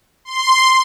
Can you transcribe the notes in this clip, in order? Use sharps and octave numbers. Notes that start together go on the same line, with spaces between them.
C6